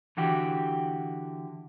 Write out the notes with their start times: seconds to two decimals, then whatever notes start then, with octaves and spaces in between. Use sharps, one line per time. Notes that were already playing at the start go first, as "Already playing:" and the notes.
0.17 D3 E3 F#4 G4